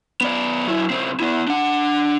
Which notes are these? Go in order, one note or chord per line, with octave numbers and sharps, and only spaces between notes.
B3 D5
F#3 E4
C#2 C4
B3 E4
D4 F#5